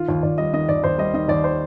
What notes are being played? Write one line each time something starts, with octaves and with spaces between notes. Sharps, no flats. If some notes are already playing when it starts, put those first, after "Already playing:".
Already playing: D#3 F4
D#2
D#2 D5
G3 D#5
D#3 D#5
D#2 D5
D#2 C5
G3 D#5
D#3 D#5
D#2 D5
C5